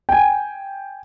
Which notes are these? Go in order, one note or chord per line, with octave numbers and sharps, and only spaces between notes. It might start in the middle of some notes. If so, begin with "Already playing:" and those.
G5 G#5